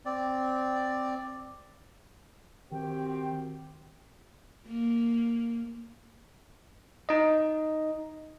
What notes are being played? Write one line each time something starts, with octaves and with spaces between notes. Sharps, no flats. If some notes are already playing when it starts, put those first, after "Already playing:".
C4 D5
D#3 C4 F#4 G4 G5
A#3
D#4 D#5